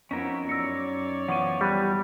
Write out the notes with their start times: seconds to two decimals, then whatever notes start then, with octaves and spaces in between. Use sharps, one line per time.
0.11 F2 B3 C#4 D#4 E4 A#4
0.49 F#2 C#5 D5 E6 A#6 C#7
1.28 E3 F3 B3 F#5 C#6 D#7
1.61 G3 B5 F#6